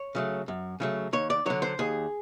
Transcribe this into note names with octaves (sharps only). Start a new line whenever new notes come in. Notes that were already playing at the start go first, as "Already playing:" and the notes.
Already playing: C#5
C#3 F#3 A3
F#2
C#3 F#3 A3
D#2 C#5
D5
D3 F#3 C#5
C5
D#2 G#4